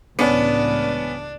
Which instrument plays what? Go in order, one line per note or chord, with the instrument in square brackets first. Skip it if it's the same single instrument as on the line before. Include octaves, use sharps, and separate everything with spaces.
[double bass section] C#2 A2 E3 [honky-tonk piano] B3 C#4 [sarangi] D4